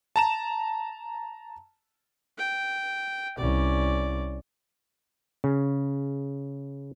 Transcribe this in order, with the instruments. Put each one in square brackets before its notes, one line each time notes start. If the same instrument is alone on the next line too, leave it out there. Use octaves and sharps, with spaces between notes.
[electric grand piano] A5 A#5 E7
[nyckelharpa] G5
[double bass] C2 [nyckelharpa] C#4 D5
[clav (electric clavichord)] C#3